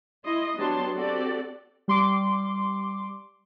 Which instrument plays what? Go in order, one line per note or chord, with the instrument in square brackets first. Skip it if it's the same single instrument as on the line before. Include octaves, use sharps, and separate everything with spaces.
[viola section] E4 D#5 C6
F#3 B3 D4 G4 A5 C6
C4 F#4 G4 A4 D5
[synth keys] G3 C6 D6